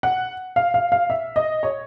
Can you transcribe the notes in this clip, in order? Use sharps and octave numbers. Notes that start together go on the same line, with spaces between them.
F#5
F5
F5
F5
E5
D#5
C#5